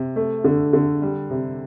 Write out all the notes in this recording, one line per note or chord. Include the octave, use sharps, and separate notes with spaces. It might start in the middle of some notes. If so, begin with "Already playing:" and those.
Already playing: C3
A3
D3
D3
G3
C3